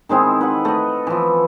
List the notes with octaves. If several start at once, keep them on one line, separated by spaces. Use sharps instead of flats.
D#3 G#3 C4 E4
B4 F#5
A3 D#5
E3 F3